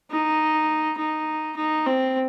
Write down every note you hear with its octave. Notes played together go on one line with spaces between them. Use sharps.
D#4
D#4
D#4
C4